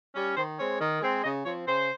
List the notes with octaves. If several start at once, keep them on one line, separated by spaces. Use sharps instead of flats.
G3 C#4
D#3 C5
G#3 C4 C#5
D#3
G#3 C4
C#3 D#5
F3 C4 C#5
C#3 C5